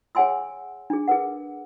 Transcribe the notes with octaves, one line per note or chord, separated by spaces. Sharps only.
G#4 C#5 F#5 G#5 C6 E6
D4 G#4
G#4 A#4 B4 F#5